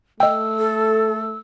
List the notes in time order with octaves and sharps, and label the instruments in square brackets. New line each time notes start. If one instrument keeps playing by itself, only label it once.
[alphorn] A3 [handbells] D#5 G5 [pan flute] E6
[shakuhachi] A4